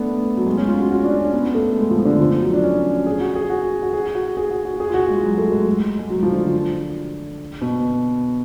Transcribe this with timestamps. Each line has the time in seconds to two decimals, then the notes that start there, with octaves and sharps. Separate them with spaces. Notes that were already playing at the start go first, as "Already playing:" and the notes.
Already playing: A3 B3 D4
0.37 F#3
0.47 G#3
0.57 C#4
0.68 F4
0.79 F#4
0.90 F#4
1.04 D4
1.19 C#4
1.33 B3
1.55 A3
1.76 G#3
1.91 F3
2.05 D3
2.20 F3
2.41 F#3
2.53 D4
2.64 C#4
3.06 G#4
3.21 F#4
3.35 G#4
3.50 F#4
3.82 F#4
3.93 G#4
4.15 F#4
4.37 G#4
4.51 F#4
4.65 F#4
4.80 G#4
4.90 F4
4.94 F#4
5.09 G#3
5.23 F#3
5.38 A3
5.48 F#3
5.52 G#3
5.99 G#3
6.10 F#3
6.23 F3
6.32 D3
7.61 B2